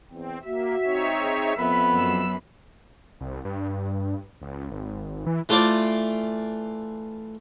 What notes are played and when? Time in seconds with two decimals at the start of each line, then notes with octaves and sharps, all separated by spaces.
0.11 E2 C4
0.45 A#3 F#4 E5
0.84 C4 D#4 C#5
1.20 G#4
1.58 F2 B3 B5
1.95 F#2 E6
3.21 C2
3.45 G2
4.42 C#2
4.71 G#1
5.27 E3
5.49 E3 A3 F4 C5 D5 D6